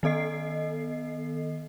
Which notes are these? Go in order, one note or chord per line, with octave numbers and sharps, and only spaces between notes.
D#3 B3 A4 D#5 C7